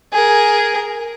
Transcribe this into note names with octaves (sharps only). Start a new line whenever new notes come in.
G#4 A#4